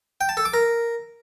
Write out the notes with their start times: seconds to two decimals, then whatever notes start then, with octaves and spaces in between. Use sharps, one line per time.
0.21 G5
0.29 A5
0.37 A4
0.45 D6
0.54 A#4